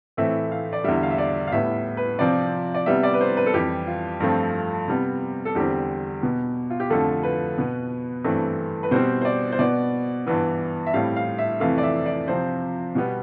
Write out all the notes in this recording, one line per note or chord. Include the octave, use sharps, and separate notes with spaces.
A2 E3 A3 C4 E5
F5
D5
E2 D3 G3 E5
F5
E5
D5
F5
A2 G3 B3 E5
B4
C3 F3 C4 D5
D5
C3 G3 B3 E5
D5
B4
C5
B4
A4
F2 E3 G3 G4
F4
G2 F3 A3 C4
C3 G3 B3
A4
E2 D3 G3 C4 G4
B2 B3
F4
G4
F2 D3 F3 A3 A4
B4
B2 B3
G2 E3 A3 C4
B4
B2 G3 C4 C5
C5
D5
C5
B2 B3 D5
G2 E3 B3
E5
A2 G3 C4 F5
F5
E5
F2 C3 E3 A3 F5
D5
E5
D5
C3 F3 C4 C5
B2 G3 B3